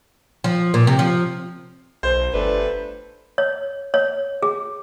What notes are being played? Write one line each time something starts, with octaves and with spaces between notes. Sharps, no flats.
F3
A#2
C3
F3
B1 C5
G1 A3 D4 B4
C#5
C#5
G#4